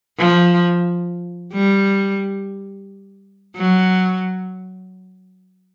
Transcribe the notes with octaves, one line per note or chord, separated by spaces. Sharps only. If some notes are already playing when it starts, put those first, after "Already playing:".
F3
G3
F#3